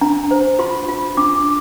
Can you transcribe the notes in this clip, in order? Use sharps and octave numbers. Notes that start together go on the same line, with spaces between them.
D4 A#5
C5
F4 C6
F4
D4 D6